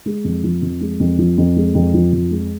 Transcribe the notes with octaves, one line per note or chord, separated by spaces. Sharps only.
G#3
F2
F3
F2
G#3
F2
F3
F2
G#3
F2
F3
F2
G#3